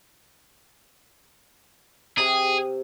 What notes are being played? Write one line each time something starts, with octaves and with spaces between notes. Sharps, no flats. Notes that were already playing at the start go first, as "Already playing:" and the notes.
C3 G#4